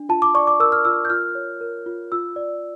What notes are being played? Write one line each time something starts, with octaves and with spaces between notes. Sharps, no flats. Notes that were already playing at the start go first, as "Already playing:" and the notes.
Already playing: D4
F4 A5
D6
D5 C#6
D6
A#4 E6
F6
F4 E6
G6
F4 F6
C#5
A#4
F4
F4 E6
D5